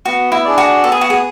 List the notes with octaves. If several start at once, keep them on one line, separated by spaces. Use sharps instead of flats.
B3 F#4
E4
D4 G#4 D5
F#4
B3 A4
G#4
F#4
G#4